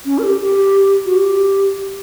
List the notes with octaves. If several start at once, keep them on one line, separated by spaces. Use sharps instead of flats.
C#4
A#4
G4
G4
F#4
G4